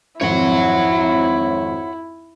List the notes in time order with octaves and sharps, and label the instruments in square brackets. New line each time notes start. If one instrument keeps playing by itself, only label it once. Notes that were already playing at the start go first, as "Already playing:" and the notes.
[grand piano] G#1 F2 [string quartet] E4 [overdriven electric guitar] C#5 F#5